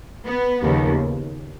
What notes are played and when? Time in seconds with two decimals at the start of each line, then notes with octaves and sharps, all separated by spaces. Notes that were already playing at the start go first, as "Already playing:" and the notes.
0.26 B3
0.63 D#2 C#3 F3